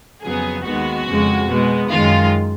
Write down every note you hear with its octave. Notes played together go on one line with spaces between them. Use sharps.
F2 C#3 F#3 B3 G#4
D#2 D#3 G#3 B3 F#4
F2 C#3 G#3
B2 G#3 B3
F#2 D#3 G#3 F4